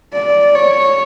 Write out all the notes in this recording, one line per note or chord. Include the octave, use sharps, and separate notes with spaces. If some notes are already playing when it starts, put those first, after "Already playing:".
D5
C#5